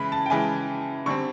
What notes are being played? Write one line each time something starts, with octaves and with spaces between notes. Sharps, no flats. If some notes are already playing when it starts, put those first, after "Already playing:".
Already playing: C#3 E3 G#3 B5
A5
G5
C#3 E3 G#3 G#5
D3 G3 C4 C#6